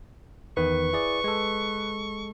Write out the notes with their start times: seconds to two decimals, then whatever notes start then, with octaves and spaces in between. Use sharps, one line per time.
0.57 E2 D#3 B4 C#6
0.93 E4 G#4 D5
1.24 G#3 A4